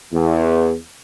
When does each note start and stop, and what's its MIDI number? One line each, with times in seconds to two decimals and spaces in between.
0.12 0.74 40